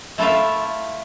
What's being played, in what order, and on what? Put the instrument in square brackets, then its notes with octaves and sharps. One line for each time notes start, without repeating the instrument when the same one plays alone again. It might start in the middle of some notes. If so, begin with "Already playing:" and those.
[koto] A3 E4 F4 E5 F5